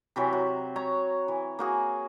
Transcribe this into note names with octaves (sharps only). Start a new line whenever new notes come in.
C3 E3 F#3
F#4
C#5 A#5
E3
A#3 F#4 G#4